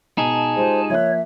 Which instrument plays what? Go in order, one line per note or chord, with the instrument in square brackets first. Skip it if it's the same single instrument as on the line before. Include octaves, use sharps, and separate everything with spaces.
[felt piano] B2 [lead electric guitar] D#4 G#4 [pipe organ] A5
[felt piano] G#3 F4 G4 [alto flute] C5
[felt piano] F3 A#3 F#6 [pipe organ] C#5 [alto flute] E5